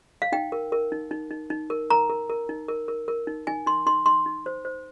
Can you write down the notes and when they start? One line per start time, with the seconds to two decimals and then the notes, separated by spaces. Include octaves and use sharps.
0.22 F5
0.32 D#4 G5
0.52 A#4
0.72 A#4
0.92 D#4
1.11 D#4
1.31 D#4
1.50 D#4
1.70 A#4
1.90 A#4 A#5
2.09 A#4
2.30 A#4
2.49 D#4
2.68 A#4
2.88 A#4
3.08 A#4
3.27 D#4
3.47 D#4 G#5
3.66 D#4 C6
3.86 D#4 C6
4.06 D#4 C6
4.26 D#4
4.46 C5
4.65 C5